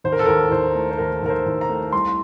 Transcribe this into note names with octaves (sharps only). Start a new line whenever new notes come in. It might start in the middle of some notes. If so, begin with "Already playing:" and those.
D#2 C5
A#4
A4
D#2 A#4
D#2 C5
A3
C5
D#2 A#4
D#2 A#4
C5
D#2
A#5
A3
C2 C6